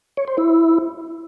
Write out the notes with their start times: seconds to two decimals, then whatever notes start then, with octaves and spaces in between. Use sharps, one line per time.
0.17 C#5
0.28 C5
0.38 E4